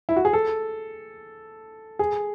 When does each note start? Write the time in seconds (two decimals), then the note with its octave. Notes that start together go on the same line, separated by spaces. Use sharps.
0.09 E4
0.16 F#4
0.25 G#4
0.33 A4
1.99 G#4